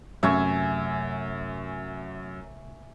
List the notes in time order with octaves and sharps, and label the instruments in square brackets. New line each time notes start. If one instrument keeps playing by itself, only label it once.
[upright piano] F#2 [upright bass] C3 A3 [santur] E5 G#5 C#6